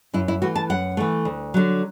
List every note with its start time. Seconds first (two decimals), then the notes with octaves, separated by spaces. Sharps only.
0.13 F#2 E4
0.28 E4
0.42 E3 A3 F#4
0.56 A5
0.70 F#2 F#5
0.97 E3 A3
1.25 D2
1.54 D3 F#3